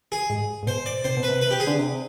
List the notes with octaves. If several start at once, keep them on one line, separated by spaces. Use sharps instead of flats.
G#4
G#2
G#2
B2 C5
D5
C3 C5
B2
B4
C3
B4
G4
G#4
D3
C3